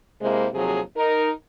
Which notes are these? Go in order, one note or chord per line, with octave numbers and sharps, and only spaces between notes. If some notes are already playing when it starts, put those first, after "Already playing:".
C3 G#3 A#3 E4 C5
D#2 C3 F3 F#3 G#4
D#4 A#4